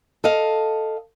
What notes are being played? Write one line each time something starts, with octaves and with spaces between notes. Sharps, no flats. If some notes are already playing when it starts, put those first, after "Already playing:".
A4 D#5 F5